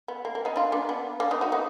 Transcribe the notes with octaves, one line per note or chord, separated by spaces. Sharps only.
B3
A#3
A#3
B3 D#4
D4 F4
A#3 D4
B3
A#3 D4
B3 D#4
D#4 F#4
B3 D#4